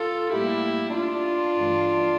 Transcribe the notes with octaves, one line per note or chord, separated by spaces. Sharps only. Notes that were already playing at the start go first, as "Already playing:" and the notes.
Already playing: F4 A4
A2 G3 A#3 E4 G4
D4 F4
G2 E3 A3